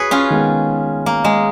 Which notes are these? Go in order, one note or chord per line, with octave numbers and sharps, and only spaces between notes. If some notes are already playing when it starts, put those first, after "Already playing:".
Already playing: F#2 G#4 B4 C#5
C#4 F4
D#3 G#3 B3
A#3
G#3